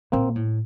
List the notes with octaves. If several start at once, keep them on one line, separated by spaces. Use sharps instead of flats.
A#2 A#3 C4
A2